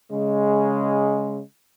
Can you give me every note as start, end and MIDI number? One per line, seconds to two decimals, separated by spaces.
0.12 1.41 49
0.12 1.41 56